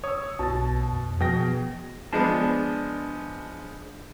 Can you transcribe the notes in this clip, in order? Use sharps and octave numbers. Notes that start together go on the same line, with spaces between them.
C#5 D#6 E6
B1 B2 A5 A6
F2
B2 F3 G#4 G5 A#6
F3 G#3 B3 D4 A5